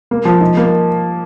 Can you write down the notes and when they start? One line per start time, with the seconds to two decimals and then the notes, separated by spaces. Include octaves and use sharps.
0.11 A#3
0.25 F3
0.41 D#4
0.57 A#3